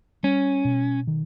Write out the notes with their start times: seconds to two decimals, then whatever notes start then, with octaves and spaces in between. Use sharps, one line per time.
0.23 G3 C#4
0.65 B2
1.07 D#3